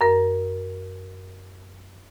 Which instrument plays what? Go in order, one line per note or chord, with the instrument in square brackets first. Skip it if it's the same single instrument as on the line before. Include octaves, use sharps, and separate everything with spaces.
[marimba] F#2 A#4